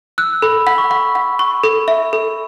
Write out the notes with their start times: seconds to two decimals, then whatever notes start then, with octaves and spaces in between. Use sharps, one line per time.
0.18 E6 F#6
0.42 A4 B5
0.67 F#5 B5
0.78 C#6
0.90 F#5 B5
1.15 F#5
1.39 C#6
1.64 A4
1.88 E5
2.13 A4